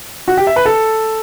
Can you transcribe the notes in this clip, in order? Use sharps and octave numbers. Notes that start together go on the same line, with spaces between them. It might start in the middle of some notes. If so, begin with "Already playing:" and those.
F#4
G4
E5
B4
A4